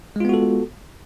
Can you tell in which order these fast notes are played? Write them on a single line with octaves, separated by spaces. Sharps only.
G#3 F4 B3 F#4 A4